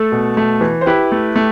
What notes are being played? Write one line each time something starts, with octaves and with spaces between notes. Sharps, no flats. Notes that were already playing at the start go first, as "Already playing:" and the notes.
Already playing: A3 A4
B2
A3
E3
C5
E4 G4 B4
A3
A3